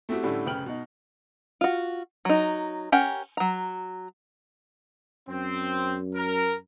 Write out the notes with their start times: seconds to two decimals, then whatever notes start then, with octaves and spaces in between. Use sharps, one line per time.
0.09 A3 C4 E4 F#4 G4
0.23 A2 D3 G3 A3 C#4 E4
0.46 F1 C#3 B4 G5 F6 F#7
0.66 B2 D#4
1.61 F4 F#4
2.25 F#3 D#4
2.92 C#4 G4 A#4 F#5
3.37 F#3 A#5
5.29 F#2 C4
6.15 A#4